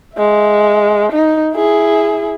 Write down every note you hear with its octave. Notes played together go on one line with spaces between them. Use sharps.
G#3 E5
D#4
E4 G#4